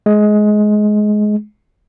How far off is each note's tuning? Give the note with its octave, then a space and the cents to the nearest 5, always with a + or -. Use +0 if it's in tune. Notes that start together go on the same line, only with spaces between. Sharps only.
G#3 +20